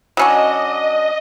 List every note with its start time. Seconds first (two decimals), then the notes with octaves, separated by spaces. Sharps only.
0.17 F#3 C#4 D4 D#5